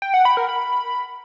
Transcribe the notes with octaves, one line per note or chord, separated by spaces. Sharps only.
G5
F#5
B5
A#4
B5